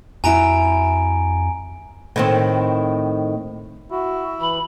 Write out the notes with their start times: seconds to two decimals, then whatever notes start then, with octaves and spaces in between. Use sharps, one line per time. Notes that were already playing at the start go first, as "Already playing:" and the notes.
0.24 F2 E4 F#4 G#5 A#5 D7
2.16 A2 D#3 C4
3.91 E4 F#4
4.40 E3 B5